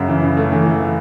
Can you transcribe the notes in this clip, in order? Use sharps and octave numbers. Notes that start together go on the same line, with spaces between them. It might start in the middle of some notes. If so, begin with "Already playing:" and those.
Already playing: F#2 C#3
E3
C#3
A3
E3
E3